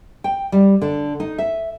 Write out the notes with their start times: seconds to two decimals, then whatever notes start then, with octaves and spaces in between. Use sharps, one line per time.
0.24 G5
0.52 G3
0.82 D3
1.20 D#4
1.38 E5